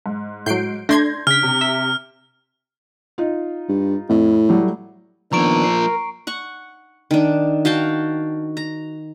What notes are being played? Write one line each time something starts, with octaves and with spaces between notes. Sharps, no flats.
G#2
A2 F#3 G6 C7 D7
A3 D4 C6 G6 G#6 A#6
C#3 F6 B6
C3
E5 B6
D#4 F4
G2
F2 A2
F#3 G3 A3
D#3 F3 A#3 B3 D4 A#5 C#6 D7
A#4 C7
F#5 C#6
D#3 D4
F#4 F5 G5 A5
A#5